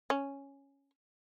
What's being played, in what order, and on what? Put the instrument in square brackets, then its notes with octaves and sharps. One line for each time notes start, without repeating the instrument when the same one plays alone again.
[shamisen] C#4